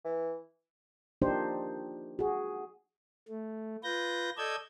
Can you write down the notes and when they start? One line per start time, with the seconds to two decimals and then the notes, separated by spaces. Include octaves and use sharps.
0.05 E3
1.22 F3 A#3 D4 D#4 G4 C5
2.19 F#4 G#4
3.29 A3
3.83 F4 B4 G6 A#6
4.38 A4 D5 D#5 E6 G6 G#6